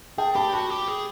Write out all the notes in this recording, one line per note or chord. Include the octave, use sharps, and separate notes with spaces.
G#4 G5 A5
G4 A5 B5
F#4 A5 B5
G4
G#4